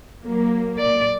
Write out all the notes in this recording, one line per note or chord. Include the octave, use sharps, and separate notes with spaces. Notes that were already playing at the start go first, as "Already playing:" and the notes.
F#3 A#3
D5